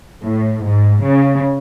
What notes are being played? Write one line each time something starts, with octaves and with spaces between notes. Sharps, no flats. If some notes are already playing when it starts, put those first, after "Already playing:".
A2
G#2
C#3